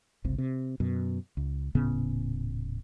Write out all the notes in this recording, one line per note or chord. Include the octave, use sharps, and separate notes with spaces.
G1 C#2 C3
C3
F#2 B2
C#2
D#1 A2 C#3 B3